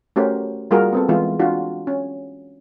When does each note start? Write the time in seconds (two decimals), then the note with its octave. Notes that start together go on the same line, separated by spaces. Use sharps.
0.16 A3 C#4 F#4 G4 A#4 C5
0.71 G3 A#3 F4 F#4 G#4 A#4
0.92 B3 C4 A4
1.09 E3 G#3 B3 E4 F4
1.39 D4 F4 F#4
1.87 C#4